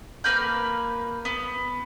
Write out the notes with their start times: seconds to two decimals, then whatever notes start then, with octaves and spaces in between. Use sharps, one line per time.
0.24 A#3 B4 F6 G6
1.25 B3